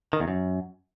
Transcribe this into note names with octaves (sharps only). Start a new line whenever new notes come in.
D#3
E2
F#2